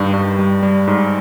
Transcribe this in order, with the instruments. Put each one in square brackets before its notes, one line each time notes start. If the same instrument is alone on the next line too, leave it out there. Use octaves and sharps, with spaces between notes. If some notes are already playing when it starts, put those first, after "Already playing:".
Already playing: [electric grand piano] G2 D#3 G3
G2
G3
G3
G#2